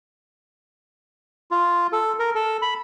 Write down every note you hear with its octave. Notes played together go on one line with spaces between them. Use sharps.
F4
A4
A#4
A4
B5